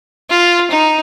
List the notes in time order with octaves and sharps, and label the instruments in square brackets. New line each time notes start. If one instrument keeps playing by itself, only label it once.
[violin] F4
D#4